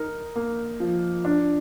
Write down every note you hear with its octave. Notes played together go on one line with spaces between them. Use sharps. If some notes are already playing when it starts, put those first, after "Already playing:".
Already playing: D#4 A#4
A#3
F3
D4